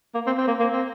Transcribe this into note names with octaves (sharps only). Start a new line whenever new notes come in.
A#3
C4
C4
A#3
A#3
C4